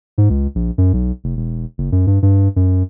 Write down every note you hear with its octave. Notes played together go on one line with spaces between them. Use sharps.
G#2
C#2
A#1
F#2
B1
F1
E1
F#1
F#2
G2
G2
F#2